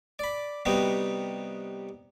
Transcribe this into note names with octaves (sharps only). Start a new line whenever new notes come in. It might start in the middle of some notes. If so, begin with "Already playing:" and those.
D5 B5
C3 G3 B3 D#4 F#4